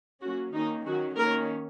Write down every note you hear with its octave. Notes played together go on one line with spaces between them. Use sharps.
F#3 A#3 C#4 F#4
D#3 A#3 C#4 D#4
D#3 F#3 C#4 F#4
D#3 A#3 C#4 A#4